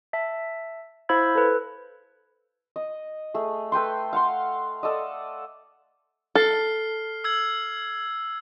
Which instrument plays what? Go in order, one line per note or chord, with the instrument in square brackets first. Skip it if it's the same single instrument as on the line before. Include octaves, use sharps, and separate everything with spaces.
[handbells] E5 A5
E4 C5 F5 B5 E6 G#6
A4 B4
[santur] D#5
A3 G#4
A4 B4 G5 C6
F5 F#5 C6
A4 D5 D#5
[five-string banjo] A4 [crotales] F6 C7
[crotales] E6 G#6